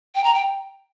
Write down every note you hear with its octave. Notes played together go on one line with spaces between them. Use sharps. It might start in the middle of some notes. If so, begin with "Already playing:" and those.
G5
A#5
G5